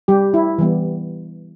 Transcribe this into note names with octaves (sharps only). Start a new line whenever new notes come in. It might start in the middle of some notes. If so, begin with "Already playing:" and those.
G3 G4
E4
E3 G3 B3